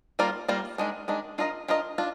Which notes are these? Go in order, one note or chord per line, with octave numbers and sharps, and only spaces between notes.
G3 A#3 F4 A#4 D5
G3 A#3 F4 A#4 D5
D#3 G#3 D4
D#3 G#3 D4
D4 F4 A#4 D#5
D4 F4 A#4 D#5
D4 F4